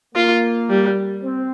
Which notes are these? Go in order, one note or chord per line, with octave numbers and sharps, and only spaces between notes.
A#3 F4
G3
C4